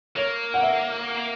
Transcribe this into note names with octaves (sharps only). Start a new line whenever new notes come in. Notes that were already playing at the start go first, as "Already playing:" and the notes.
A#3 C#5
F#5
E5